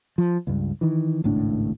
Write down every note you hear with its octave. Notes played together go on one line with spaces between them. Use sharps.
F3
C#2 G2
D#3 E3
G#1 C#2 A2 D4